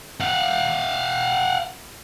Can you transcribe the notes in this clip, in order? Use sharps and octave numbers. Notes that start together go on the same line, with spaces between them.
F5 F#5